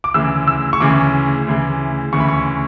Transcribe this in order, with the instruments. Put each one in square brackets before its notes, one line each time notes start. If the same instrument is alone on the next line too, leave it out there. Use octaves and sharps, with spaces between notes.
[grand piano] D6
D2 C#3 E3 E6
E6
C#6
D2 C#3 E3 D6
D2 C#3 E3
D2 C#3 E3 C#6
B5
C#6